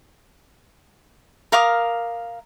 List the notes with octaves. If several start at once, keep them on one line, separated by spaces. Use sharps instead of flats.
A#4 F5 D6 D#6